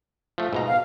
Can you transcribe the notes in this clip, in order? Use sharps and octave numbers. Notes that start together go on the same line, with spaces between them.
F3 A3
G#2 B2 A#5
F5